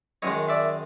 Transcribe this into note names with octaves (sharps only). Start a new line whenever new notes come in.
F#2 D#3 G#3 C#5 D#5
D5 E5